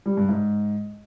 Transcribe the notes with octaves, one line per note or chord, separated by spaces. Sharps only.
G3
G2
G#2